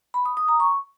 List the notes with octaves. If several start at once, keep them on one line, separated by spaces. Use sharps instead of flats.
B5
D#6
D#6
A#5
C#6